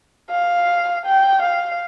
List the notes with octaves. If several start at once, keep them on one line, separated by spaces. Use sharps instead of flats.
F5
G5
F5